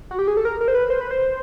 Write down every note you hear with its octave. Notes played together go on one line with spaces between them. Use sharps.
F#4
G4
G#4
A4
A#4
A#4
C5
B4
C5
B4
C5